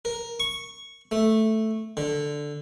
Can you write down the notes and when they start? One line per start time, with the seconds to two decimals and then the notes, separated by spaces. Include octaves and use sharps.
0.05 A#4
0.40 C#6
1.11 A3
1.97 D3